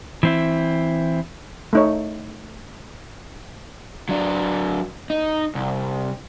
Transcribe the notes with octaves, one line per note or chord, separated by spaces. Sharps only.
E3 C4 E4
A3 D#4 C#5
F#3 D4
D#4
C2